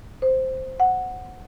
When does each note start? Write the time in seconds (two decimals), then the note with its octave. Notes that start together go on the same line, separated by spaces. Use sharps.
0.22 C5
0.80 F#5